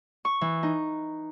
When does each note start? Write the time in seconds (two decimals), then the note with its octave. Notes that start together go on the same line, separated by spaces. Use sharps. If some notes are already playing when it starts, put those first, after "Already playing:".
0.25 C#6
0.41 E3
0.63 D#4